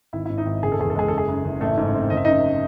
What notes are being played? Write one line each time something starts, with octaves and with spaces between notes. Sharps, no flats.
G#1 E4 E5
E4 E5
G#2
D#4 D#5
G#1
F#1 G#4
A4
E2 G#4
A4
G#3 G#4
F#1 A4
G#4
F#2
F#1
A1 A3 A4
G#2
C4
F#1 D#5
E5
F#2 D#4 D#5